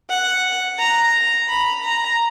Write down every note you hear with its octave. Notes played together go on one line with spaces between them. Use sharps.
F#5
A#5
B5
A#5